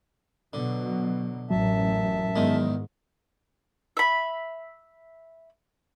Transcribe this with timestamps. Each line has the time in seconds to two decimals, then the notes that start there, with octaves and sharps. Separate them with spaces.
0.53 B2 D3 F#3
1.51 A1 F#2 F#3 E5 A5
2.36 E2 G#2 D#3 G#3
3.97 E5 B5